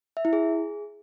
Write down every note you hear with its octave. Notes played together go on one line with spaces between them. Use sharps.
E5
E4
G#4